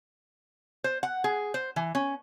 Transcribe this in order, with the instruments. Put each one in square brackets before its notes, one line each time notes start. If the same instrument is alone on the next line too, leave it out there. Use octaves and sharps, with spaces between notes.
[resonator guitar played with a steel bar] C5
F#5
G#4
C5
E3
C#4